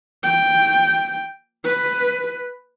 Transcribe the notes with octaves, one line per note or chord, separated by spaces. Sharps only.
G5
B4